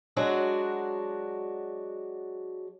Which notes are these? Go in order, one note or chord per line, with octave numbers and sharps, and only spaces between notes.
F#3 G#3 D4 F#4